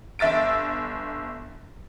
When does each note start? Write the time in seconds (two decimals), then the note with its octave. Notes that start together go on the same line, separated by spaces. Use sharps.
0.19 G1 E5 E6 A6 D7